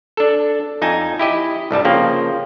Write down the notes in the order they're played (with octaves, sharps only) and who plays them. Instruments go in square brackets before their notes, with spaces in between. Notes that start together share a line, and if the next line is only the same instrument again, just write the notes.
[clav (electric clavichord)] D4 A4
F2 D#4 G#5 A5
E4 G4 D#5
C2 G2 G3 A5
C#3 F3 A#3 C4